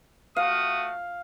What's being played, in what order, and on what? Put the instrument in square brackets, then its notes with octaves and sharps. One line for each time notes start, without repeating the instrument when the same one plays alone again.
[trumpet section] A3 F#4 D#6 [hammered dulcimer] F5